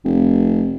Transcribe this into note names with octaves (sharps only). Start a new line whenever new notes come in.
F1